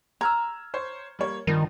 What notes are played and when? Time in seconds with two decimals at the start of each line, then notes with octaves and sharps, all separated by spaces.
0.21 A#5 E6 F6 G#6
0.74 C5 C#5
1.19 G3 A#3 C#5
1.47 G2 D#3 F3